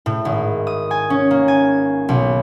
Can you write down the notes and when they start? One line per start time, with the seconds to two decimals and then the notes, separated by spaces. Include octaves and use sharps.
0.06 A2
0.25 G#1
0.67 D#6
0.91 G#5
1.10 C#4
1.31 A#3
1.48 G#5
2.09 B1